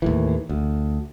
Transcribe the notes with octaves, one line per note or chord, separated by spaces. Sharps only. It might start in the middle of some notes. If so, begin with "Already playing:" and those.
D#2 A2 E3
D2